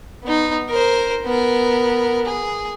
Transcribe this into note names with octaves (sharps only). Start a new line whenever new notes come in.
B3 D#4
A#4 C5
B3 A#4
G#4